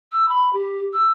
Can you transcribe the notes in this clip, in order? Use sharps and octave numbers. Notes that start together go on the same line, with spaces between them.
E6
B5
G4
E6